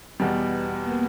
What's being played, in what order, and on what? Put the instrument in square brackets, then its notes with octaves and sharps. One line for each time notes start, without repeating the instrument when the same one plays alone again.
[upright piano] E2 B2 G3 [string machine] B3
[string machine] A#3